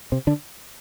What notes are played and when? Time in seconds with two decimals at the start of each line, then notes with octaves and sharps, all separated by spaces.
0.12 C3 C4
0.27 D3 D4